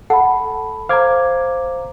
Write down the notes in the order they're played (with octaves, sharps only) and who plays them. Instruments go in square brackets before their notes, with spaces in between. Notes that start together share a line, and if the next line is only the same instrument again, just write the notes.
[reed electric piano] A4 [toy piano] F#5 [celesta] A5 B5
[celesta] C5 A#5 [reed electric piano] F5 D6 G#6